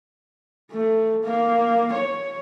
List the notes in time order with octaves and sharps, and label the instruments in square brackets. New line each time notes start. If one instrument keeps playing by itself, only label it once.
[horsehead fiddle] A3
A#3
C#5